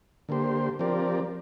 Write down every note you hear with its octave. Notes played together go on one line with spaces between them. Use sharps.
D3 A#3 G4 C5
F3 C4 G4 A#4 D5